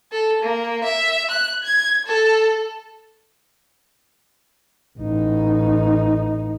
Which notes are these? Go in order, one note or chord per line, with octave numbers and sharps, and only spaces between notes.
A4
A#3
E5
F#6
G#6
A4
A1 D#4